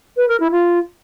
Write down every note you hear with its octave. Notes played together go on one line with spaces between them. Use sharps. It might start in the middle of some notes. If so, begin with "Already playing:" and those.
B4
A#4
E4
F4